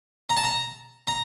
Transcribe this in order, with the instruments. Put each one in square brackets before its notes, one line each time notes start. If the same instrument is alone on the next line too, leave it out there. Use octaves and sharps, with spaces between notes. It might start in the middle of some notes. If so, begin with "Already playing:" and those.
[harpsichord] A#5
A5
A#5
A#5